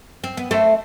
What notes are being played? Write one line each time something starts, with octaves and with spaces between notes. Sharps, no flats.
C4
B3
A3 C4